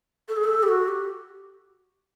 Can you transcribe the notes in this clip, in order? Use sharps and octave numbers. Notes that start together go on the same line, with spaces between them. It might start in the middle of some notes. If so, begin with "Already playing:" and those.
A4
G#4
A4
G4
F#4
G4